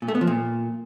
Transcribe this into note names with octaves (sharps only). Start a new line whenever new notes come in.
A#2
A3
B3
F3
A#2